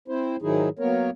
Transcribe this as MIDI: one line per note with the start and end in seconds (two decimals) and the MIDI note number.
0.08 0.36 60
0.08 0.36 64
0.08 0.36 72
0.42 0.69 44
0.42 0.69 51
0.42 0.69 54
0.42 0.69 63
0.42 0.69 64
0.42 0.69 68
0.79 1.10 54
0.79 1.10 58
0.79 1.10 59
0.79 1.10 70
0.79 1.10 73